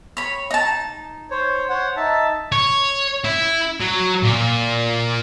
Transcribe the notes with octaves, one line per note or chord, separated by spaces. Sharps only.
C#5 B5
D#4 A5
C5 C#5
C5 C#5 F#5
D#4 E5 A5
C#5
E4
F#3
A#2